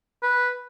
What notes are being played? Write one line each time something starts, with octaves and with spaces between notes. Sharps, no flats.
B4